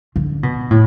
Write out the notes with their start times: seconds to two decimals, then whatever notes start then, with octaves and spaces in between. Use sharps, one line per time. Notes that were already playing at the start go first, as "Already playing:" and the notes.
0.16 D3
0.43 B2
0.71 A2